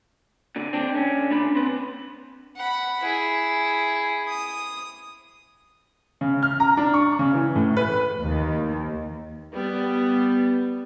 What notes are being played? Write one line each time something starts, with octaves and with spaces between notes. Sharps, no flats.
A#2 D3
C4 D4
D3 C#4
A#3 D4 B5
C4 B4
F#5 B5
E4 G#4
D#6
C#3
F6
A#5
D4
C#6
C#3
E3
A2
B4
D#2
G3 B3